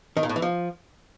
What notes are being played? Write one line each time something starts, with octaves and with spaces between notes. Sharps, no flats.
D#3
A#2
A2
E3
F3